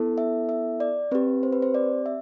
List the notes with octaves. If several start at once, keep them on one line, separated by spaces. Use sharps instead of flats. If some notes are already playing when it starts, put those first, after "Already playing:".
Already playing: B3 E4 A4
E5
E5
D5
C4 G4 B4
C5
B4
C5
D5
E5